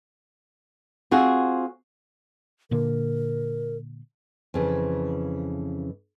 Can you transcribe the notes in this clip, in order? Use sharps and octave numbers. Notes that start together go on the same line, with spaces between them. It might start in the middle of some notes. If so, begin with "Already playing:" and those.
C4 F4 F#4 G#4
A#2 D3 A#3 A#4
F2 C#3 E3